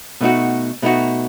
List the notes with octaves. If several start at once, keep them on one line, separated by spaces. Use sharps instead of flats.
B2 A3 D#4 F#4
B2 A3 D#4 F#4